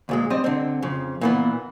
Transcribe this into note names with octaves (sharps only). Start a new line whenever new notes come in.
D2 A#2 G#3
G3 C4 D#5
D3 C4
F2 C#3
A#2 E3 B3